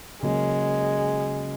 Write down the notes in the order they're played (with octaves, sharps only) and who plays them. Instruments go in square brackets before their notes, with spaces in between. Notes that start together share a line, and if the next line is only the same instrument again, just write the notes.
[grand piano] C#3 F#3 A#3 C#4 [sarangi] G#3